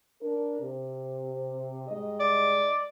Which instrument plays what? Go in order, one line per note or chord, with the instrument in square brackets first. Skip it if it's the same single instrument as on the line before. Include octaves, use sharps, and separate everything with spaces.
[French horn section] D4 A#4
C3
G#2 G3 D#5
[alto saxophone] D5